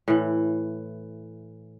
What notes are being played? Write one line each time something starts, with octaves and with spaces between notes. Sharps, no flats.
A2 E3